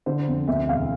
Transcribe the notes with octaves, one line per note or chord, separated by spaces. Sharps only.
D3 C5
F2
D2 E5
E1 F5